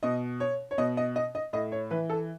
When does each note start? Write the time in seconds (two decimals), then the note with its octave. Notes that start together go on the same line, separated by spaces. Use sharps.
0.03 B2 D#5
0.40 C#5
0.71 C#5
0.78 B2 D#5
0.97 D#5
1.16 D#5
1.35 D#5
1.53 A2 D#5
1.72 C#5
1.91 E3 B4
2.10 A4